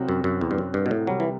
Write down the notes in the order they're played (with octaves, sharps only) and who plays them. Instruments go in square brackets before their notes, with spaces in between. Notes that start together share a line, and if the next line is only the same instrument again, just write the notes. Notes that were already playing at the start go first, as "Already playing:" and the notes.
Already playing: [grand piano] C2 C3 F#3 C4 F#4
[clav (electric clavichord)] F#2
F#2
E2
G2
F#2
G2
B2
A2
[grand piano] C2 C3 G3 [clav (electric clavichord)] F#3
[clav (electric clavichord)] E3